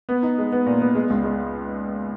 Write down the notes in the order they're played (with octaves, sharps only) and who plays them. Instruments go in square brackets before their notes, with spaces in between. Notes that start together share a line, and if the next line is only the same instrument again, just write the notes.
[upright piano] B3
D#4
G#3
B3
A#2
B3
G#3
C#2
G#3